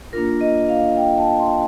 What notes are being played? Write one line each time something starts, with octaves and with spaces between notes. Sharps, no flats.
A#3 D4 F4 A#4
D#5
F5
G5
A5
C6